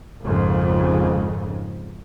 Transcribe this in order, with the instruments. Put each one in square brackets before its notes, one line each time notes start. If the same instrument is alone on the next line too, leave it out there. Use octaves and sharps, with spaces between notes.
[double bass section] G#1 F2 G#2 C#3